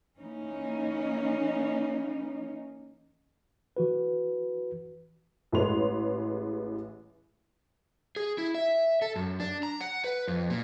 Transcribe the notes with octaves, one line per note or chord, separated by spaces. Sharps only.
E3 A#3 C#4 D#4
E3 F#4 B4
A1 G#3 B4 C#5 C6 F7
G#4
E4
E5
A4
F#2
D4
A#5
F#5
B4
F2
A#2